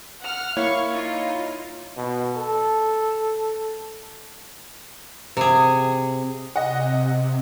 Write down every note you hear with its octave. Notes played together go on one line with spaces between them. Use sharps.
F#5 F6
A#3 E4 C#5 F5 C#6
D#4 F4
B2
A4
C3 G#4
C3 D#5 F#5